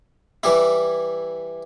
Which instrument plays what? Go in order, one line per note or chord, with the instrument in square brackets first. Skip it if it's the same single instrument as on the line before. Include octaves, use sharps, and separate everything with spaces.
[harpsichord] E3 G3 E4